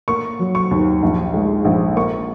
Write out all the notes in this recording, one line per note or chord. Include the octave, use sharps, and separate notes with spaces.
A#3 C#6
F#3
C#6
D#2
A#1
G#3
A#1
A#3 C#6